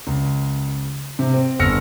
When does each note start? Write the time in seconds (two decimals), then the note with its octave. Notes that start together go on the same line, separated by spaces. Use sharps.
0.07 C#2
1.19 C3
1.34 C4
1.59 G1 E6 F6 A#6 C#7